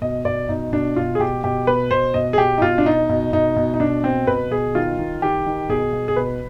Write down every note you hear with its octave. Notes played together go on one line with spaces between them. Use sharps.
B2 D#5
B2 D5
B2 D#4
B2 D4
B2 F4
G#4
B2 G4
B2 G4
B2 B4
B2 C5
B2 D#5
G#4
B2 G4
D#4
B2 F4
D4
B2 D#4
B2
B2 D#4
B2
D#4
B2 D4
B2 C4
B2 B4
B2 G#4
D#3 F4
D#3
D#3 G4
D#3
B2 G#4
B2
G#4
B2 B4